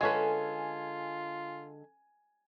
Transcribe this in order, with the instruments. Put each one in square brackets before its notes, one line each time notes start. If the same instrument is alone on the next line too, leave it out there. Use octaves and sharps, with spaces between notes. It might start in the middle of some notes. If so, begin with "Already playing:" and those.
[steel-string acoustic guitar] D3 A4 [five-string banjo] G#3 C#4 B4 [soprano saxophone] F4 [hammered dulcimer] G#5